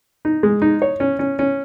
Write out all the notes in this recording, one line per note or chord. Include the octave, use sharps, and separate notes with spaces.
D#4
G#3
D#4
C#5
C#4
C#4
C#4